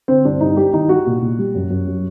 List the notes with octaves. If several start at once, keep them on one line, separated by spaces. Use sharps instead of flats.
D3 C4
G2 D4
G2 D#4
G3 G4
D#3 D#4
G3 F#4
A#2
A#2
G3
F#2
F#2
F#3